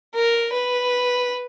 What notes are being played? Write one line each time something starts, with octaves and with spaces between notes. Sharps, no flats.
A#4
B4